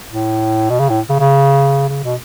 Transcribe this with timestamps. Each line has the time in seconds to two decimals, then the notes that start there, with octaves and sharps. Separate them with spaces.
0.11 A2
0.70 B2
0.80 C#3
0.90 A2
1.09 C#3
1.20 C#3
1.89 C#3
2.04 B2